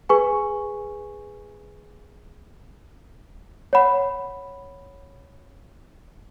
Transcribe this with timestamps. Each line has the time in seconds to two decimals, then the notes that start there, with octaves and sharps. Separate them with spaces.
0.09 G#4 B4 G#5 C#6
3.73 C#5 F#5 B5